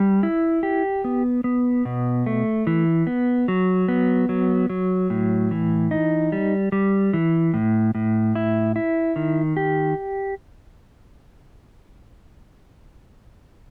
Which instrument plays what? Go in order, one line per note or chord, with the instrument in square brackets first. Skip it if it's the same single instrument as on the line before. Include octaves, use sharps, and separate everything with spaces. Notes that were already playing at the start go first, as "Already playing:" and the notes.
Already playing: [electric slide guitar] G3
E4
G4
B3
B3
B2
A3
E3
B3
F#3
B3
F#3
F#3
A2
E3
D#4
G3
G3
E3
A2
A2
E4
E4
D#3
G4